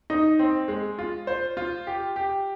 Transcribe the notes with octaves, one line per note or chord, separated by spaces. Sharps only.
D#4
C4
G#3
F4
C5
F4
G4
G4